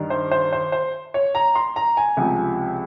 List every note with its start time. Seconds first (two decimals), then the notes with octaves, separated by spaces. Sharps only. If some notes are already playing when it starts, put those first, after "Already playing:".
Already playing: G2 D#3
0.10 C5
0.31 C5
0.53 C5
0.72 C5
1.14 C#5
1.35 A#5
1.55 C6
1.76 A#5
1.97 G#5
2.17 C#2 C3 F3